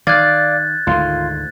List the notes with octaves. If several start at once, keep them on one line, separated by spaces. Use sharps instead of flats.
D#3 D5 F5 F#6 G#6 A6
D2 G#2 D#3 F4 F5 C6